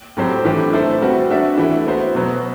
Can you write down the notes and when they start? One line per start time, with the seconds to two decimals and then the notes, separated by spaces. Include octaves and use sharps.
0.17 A2 F#3 C4 G4 C5
0.45 A2 E3 A3 D4 G4
0.73 A3 E4 A4 C5
1.02 G3 C4 F#4 B4
1.30 A3 D4 F#4 A4 E5
1.58 E3 A3 E4
1.87 B3 F#4 C5 E5
2.15 B2 F#3 B3